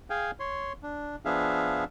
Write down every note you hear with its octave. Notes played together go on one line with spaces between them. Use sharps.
G#4 F5 G5 G#5
C#5 C6
D4
F3 B3 D4 G#4 E5 F5